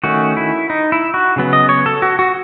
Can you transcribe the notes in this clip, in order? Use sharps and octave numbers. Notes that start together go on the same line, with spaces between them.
D#3 A3 C#4 F#4
E4
D#4
E4
F#4
C#3 F#3 B3
D#5
C#5
A4
F#4
F#4